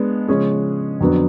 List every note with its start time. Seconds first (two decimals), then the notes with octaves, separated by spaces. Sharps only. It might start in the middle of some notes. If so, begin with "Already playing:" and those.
Already playing: G#3 B3 D4
0.28 C#3 F3 G#3 C#4 G#4
1.00 F2 D3 F#3 B3